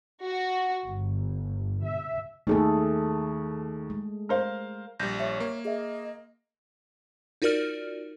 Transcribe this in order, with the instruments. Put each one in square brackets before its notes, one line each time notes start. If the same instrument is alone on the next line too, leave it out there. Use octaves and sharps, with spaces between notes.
[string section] F#4
G1
E5
[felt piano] D#2 D#3 [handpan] A3 G#4 A4
[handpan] G#3
[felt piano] A#4 C5 F5
[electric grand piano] A#1 G3 [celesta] G6 A#6
[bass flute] C#5 [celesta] E5
[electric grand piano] A#3
[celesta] G#4 E5 [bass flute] D#5
[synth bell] D#4 F4 F#4 A#4 D5 F6